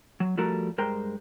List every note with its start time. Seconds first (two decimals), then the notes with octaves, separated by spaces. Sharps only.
0.20 F#3
0.37 F3 G3 A3 F#4 A4 A#4
0.78 G2 G#3 A#4 C5 G5 A#5